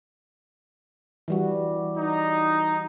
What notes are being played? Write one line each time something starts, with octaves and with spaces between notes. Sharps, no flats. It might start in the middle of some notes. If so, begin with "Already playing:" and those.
E3 G3 F#4
D#4